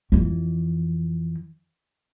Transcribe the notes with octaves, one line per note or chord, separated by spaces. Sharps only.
F2 E3